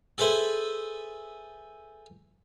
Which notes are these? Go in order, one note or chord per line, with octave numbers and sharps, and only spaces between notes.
G#4 A4 B4 C5 E5 G#5